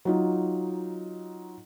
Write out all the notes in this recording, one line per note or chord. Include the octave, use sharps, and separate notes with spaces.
F#3 D#4 F4